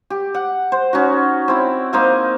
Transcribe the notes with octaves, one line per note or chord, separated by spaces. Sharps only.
G4
F#5
C5
C#4 D#4 F#4
C4 E4
A#3 D#4 C5 F5